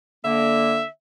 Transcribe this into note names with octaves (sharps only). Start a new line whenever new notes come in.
D3 A#3 E5